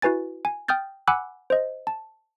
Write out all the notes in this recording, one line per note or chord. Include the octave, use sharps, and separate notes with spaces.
E4 F#4 B4 G#5 A6
G#5
G5 D#6 F6 G6 A6
F#5 G#5 B5 D6 E6 F#6
C5 D#5
A5